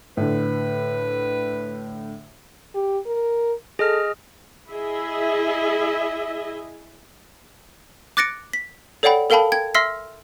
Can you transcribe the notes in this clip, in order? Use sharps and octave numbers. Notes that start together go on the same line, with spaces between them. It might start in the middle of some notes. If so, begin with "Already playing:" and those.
A2 D3 B4
G4
A#4
G#4 A4 D#5 F6
E4 G#4 D#5 E5
D6 F#6 A6 A#6 C#7 D7
B6
A4 C#5 D5 F#5 G5 B5
A4 A#4 F5 G5 A5 B5
G5 G#6
E5 C6 E6 F6 B6 C7